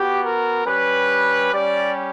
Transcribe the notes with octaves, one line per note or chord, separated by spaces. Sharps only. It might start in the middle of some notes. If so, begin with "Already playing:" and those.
Already playing: B3 F#4 G4
A#4
G3 C#4 G4 B4
G3 C#4 G4 D5